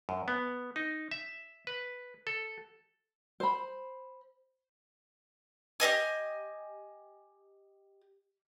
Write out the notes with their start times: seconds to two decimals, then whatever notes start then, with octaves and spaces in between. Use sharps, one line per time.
0.09 F#2
0.28 B3
0.76 D#4
1.11 E5
1.67 B4
2.27 A4
3.40 C5 B5
5.80 G4 C#5 D#5 G#5